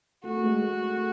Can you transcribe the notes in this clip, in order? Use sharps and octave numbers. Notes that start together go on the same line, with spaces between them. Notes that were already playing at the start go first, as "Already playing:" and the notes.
A3 F#4
A3
G#3
G#3
A3
A3